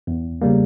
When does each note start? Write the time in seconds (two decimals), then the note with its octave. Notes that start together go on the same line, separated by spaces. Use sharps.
0.07 E2
0.42 C#3 G3 A#3